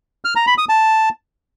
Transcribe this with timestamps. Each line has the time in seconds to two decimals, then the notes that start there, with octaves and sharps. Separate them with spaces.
0.25 F6
0.36 A#5
0.47 B5
0.58 D#6
0.69 A5